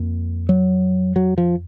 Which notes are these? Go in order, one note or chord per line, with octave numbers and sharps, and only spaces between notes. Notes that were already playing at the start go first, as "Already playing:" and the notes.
Already playing: F2 A#3
F#3
F#3
F3